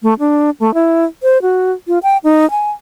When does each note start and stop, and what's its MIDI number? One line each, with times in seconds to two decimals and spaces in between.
0.03 0.14 57
0.19 0.50 62
0.60 0.74 57
0.74 1.05 64
1.23 1.41 72
1.42 1.72 66
1.88 1.99 65
2.03 2.18 79
2.24 2.49 63
2.51 2.70 80